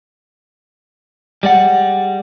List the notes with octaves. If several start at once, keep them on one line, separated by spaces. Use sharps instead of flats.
G3 G#3 D5 F#5